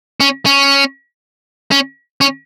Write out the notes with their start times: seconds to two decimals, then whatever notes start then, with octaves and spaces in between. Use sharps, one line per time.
0.20 C#4
0.46 C#4
1.71 C#4
2.21 C#4